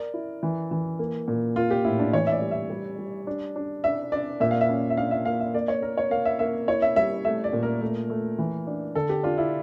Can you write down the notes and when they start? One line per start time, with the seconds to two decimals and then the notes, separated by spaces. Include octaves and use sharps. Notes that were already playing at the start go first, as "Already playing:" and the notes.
Already playing: A#4 D5
0.14 E4
0.43 E3
0.71 E3
0.99 A#3
1.28 A#2
1.56 A#3 F4
1.70 G4
1.84 A2 E4
1.99 D4
2.13 E3 C#5
2.27 E5
2.32 D5
2.42 G3
2.51 E5
2.70 G3
2.99 G3
3.27 D4
3.56 D4
3.84 D4 E5
4.12 D4 D5
4.40 A#2 E5
4.51 F5
4.61 E5
4.69 C#4
4.90 E5
4.97 D4 F5
5.11 E5
5.25 A#3 F5
5.40 E5
5.54 A#3 D5
5.68 C#5
5.82 A#3 A#4
5.97 C#5
6.11 A#3 F5
6.25 E5
6.39 A#3 E5
6.68 E4 C#5
6.82 E5
6.96 G3 E5
7.25 A3 E5
7.44 D5
7.53 A#2
7.63 A#4
7.81 A3
8.10 A3
8.38 E3
8.67 D4
8.95 D3 A4
9.09 G4
9.23 D4 F4
9.38 E4